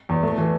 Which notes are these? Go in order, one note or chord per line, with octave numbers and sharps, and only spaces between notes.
E2
A3
E3